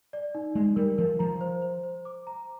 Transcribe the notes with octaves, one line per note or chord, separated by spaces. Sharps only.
D5
D#4
G#3 D#4
G3 A#4
F3 A#4
F3 A#5
C5
C5
C5
D6
A#5